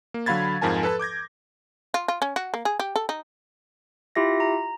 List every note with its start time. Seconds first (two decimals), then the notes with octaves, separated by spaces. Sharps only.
0.14 A#3
0.26 D3 F#3 F5 B5 G#6 A6
0.62 F2 G#2 F3 A#4 G#5 A5
0.83 A4 B4 A5
0.99 D6 G6 G#6 A#6
1.94 F4
2.08 F4
2.22 C#4
2.36 F#4
2.54 A#3
2.65 G#4
2.80 G4
2.96 A4
3.09 D#4
4.16 E4 F4 G4 E5 A#6
4.40 A#5